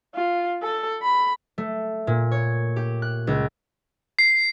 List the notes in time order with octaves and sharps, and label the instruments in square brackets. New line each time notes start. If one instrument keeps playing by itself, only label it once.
[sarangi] F4
A4
B5
[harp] A3
A#2
C#5
G4
F#6
C#2
[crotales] C7